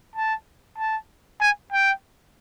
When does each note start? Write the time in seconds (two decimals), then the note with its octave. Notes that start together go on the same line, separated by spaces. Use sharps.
0.15 A5
0.78 A5
1.41 G#5
1.73 G5